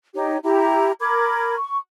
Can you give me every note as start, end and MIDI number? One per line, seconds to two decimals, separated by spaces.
0.15 0.37 63
0.15 0.37 67
0.15 0.37 73
0.43 0.92 64
0.43 0.92 67
0.43 0.92 82
1.00 1.55 70
1.00 1.55 83
1.00 1.55 86
1.00 1.55 92
1.57 1.76 85